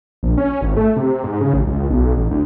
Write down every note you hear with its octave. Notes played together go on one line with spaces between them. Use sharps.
A#1
C#4
G#1
A3
C3
G#2
C#3
A1
C#2
B1
A1
D2